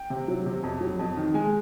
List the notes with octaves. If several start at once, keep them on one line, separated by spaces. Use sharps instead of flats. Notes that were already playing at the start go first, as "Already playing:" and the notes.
Already playing: G5
C3
F#3
C3
F2
F#3
F2
D#3
G#3 G#5